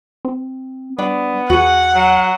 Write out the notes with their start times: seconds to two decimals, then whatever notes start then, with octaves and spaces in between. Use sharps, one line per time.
0.25 C4
0.99 G3 B3 D4
1.50 E2 F#4 G#4 F#5
1.95 F#3